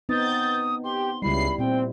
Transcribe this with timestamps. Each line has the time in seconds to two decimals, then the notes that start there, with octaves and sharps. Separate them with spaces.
0.09 B3 C4 D#4 D#6 G6 A6
0.83 G4 C6
1.22 C#2 G3 E4 B5 C7
1.58 A#2 C4 G5